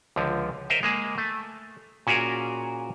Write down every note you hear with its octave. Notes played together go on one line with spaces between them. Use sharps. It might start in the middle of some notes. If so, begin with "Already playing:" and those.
C#2 D3 F3
A#4 C5 D#5 E5
G#3 A#3 G#4
A3
A#2 C#4 F#4 G#4 A#4